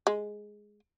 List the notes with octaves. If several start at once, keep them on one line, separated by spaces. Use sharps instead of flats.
G#3